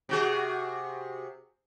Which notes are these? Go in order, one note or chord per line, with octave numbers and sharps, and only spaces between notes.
C3 F#4 G#4